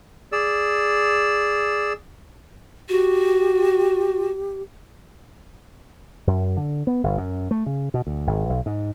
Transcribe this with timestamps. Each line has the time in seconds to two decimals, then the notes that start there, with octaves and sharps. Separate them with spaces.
0.32 G#4 D5 E6
2.89 F#4 G4
6.27 F#2
6.57 D3
6.87 B3
7.04 G1
7.17 F#2
7.51 A3
7.66 C#3
7.94 B2
8.07 D2
8.27 G#1
8.49 B1
8.66 G#2